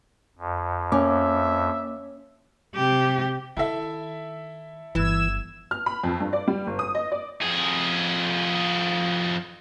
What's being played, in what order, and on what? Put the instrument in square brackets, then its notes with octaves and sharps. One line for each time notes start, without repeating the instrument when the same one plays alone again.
[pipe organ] F2
[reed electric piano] A#3 D6 [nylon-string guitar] C#4 [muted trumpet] E5
[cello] C3 G4
[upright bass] D#3 [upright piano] E4 A4 E5
[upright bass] G1 [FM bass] E3 [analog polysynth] E6 G#6 E7
[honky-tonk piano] F6
B5
F2
G2
D5
G3
G1
D#6
D#5
D5
[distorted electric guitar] F2 G#4